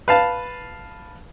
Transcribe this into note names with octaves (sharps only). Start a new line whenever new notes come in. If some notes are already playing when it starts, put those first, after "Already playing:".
B4 F5 A5